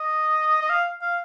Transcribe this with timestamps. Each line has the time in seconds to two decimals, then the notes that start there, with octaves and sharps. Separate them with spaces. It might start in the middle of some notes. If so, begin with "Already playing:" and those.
Already playing: D#5
0.62 D#5
0.70 F5
1.02 F5